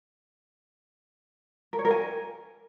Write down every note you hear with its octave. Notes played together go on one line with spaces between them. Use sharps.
A#4
C#5
A#4
G#5